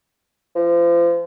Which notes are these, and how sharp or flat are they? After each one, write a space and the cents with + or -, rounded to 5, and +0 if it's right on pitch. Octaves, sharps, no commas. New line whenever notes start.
F3 -35